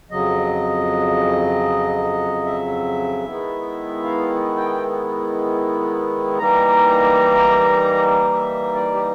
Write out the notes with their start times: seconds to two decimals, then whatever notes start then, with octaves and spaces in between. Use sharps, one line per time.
0.10 F2 C#3 F#3 D#5
2.46 E5
3.25 D#3 G#3 B3 E4
4.04 F5
4.56 G5
6.38 E3 G3 A#3 D#4 A#5
8.34 E5
8.74 D5
8.93 G4